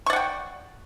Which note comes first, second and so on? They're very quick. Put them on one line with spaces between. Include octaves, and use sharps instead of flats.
C#6 D5 F#5 G5